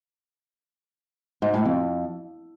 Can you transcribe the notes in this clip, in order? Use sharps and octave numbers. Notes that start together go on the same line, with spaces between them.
G#2
A2
F2